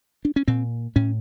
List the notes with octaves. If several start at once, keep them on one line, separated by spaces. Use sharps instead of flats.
D4
C#4
A#2 C4
A2 C#4